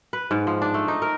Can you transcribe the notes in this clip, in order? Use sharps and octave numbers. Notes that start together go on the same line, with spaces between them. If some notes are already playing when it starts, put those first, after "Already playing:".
B4
G#2
F3
D4
A3
D#4
A#4